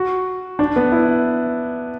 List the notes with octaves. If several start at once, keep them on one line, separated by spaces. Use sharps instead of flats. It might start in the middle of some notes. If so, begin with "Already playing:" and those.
Already playing: F#4
D4
B3
E4